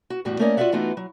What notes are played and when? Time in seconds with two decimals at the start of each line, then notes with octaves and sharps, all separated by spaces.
0.10 F#4
0.25 E2 A2 G3 F#4
0.39 A3 A#3 C#4 A#4 D5 D#5
0.57 F4 F#4 G#4 D5 E5 F#5
0.72 E3 A3 B3 D#4 F4 F#4
0.97 F#3